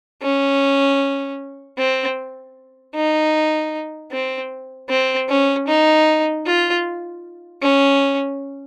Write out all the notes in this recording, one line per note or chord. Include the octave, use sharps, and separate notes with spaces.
C#4
C4
D#4
C4
C4
C#4
D#4
F4
C#4